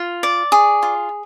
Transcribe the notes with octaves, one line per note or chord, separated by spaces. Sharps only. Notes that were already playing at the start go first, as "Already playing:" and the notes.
Already playing: F4
D5
G#4
F4